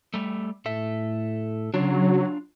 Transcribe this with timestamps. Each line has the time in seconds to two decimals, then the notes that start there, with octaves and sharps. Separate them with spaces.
0.14 G3 A3
0.66 A2 A4 E5
1.74 C#3 F#3 D4 F4